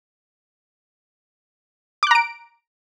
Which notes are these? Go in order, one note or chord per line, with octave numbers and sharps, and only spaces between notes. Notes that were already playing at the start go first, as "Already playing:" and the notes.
A#5 D6 F#6 D7